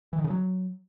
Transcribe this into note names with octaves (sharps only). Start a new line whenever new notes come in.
E3
D#3
C#3
F#3